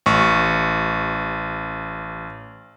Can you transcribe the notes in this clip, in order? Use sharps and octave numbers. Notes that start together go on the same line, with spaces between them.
A1 C#6